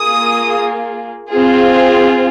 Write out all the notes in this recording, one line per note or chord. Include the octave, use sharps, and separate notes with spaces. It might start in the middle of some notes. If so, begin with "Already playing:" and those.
Already playing: A#3 F4 G#4 D#6
C4 F4 G#4